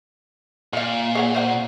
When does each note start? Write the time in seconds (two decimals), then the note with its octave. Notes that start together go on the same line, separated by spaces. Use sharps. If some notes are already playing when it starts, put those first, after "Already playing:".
0.73 A#2 F4 F5
1.15 G#4 C#5 F#5
1.35 C5 F5 F#5